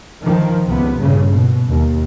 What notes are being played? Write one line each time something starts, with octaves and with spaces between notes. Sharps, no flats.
D#3 F3
C#2 C3 B3
G2 A#2 C#3
B2
D#2